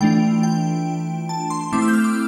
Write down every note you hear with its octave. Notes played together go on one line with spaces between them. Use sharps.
E3 A3 D4 F4 G5
G5
A5
C6
A3 C4 E4 D6
E6
G6
F6
D6